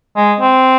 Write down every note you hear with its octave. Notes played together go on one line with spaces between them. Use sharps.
G#3
C4